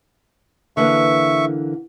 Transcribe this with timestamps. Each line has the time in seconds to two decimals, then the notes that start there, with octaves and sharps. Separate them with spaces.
0.77 D3 E3 A#3 E5 C#6